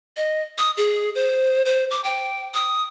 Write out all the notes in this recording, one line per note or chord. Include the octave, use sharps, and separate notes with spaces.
D#5
D#6
G#4
C5
C5
D6
G5
D#6